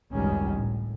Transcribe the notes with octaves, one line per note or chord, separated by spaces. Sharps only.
G#1 C#2 F#2 D#3 G3 C#4
A2